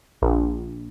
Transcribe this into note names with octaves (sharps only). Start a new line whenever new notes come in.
A#1